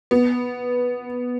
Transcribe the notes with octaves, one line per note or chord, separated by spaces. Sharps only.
B3